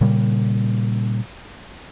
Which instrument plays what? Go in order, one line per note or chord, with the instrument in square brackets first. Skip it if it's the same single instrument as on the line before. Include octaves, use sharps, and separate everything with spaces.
[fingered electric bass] A#2 C#3 G3